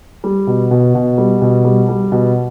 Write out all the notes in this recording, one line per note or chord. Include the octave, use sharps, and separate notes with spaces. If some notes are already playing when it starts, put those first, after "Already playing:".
G3
B2
B2
B2
G3
B2
G3
G3
B2